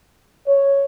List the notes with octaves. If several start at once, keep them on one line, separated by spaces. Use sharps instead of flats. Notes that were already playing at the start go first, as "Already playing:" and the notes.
C#5